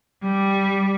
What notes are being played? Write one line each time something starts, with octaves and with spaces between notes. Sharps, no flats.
G3